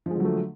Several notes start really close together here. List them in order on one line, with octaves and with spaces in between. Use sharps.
F3 G#3 D3 F#3 A3